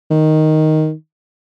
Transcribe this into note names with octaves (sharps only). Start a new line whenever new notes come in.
D#3